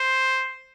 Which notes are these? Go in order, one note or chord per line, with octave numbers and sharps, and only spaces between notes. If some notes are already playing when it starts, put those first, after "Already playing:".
Already playing: C5